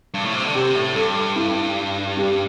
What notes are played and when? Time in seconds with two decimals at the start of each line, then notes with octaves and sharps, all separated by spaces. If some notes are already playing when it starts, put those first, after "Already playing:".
0.14 G2
0.24 A2
0.33 C3
0.44 D3
0.55 C3 G4
0.75 A2
0.95 G2 A4
1.36 E4
2.17 G4